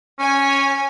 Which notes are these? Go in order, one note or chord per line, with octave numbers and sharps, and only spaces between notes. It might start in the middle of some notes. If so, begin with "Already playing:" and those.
C#4 C#5 G#5